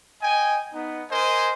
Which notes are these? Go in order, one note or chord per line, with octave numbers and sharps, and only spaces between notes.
D#5 G5 G#5
B3 D#4
A#4 C5 D#5 G#5